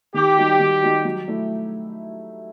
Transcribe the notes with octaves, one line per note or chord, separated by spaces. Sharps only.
D#3 G4
G3 D#4 F#4
D#3
G3 D#4 F#4
F#3
A3 E4